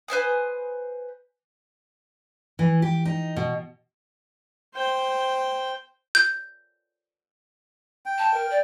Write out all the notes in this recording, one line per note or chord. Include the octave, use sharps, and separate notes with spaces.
B4 C5 G#5 D#6
E3
G4
D#4
B2
C5 G5
G6
G5
A5
A#4
D5